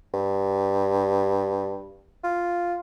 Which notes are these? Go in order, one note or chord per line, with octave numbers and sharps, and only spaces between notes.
G2
F4